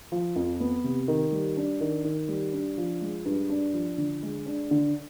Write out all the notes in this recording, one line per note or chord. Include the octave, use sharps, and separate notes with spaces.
F3
F2
B3
C3
D#3
G3
D4
D#3
D#3
G3
D4
F3
G#3
G2
D4
F3
D3
G#3
D4
D3